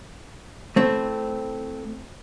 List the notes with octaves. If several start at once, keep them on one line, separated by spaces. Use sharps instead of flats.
A3 C4 E4